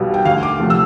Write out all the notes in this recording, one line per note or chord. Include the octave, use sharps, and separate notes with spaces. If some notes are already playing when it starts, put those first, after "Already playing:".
Already playing: B1 B2 G3
G5
D2 F5
D6
C3 F3 A3
E6